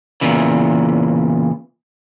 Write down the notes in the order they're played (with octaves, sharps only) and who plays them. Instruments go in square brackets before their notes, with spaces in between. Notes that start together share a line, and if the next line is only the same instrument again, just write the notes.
[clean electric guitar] E2 A#2 C#3 E3